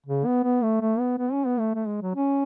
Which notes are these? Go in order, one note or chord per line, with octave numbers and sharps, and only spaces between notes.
C#3
B3
B3
A3
A3
B3
B3
C#4
B3
A3
A3
G#3
F#3
C#4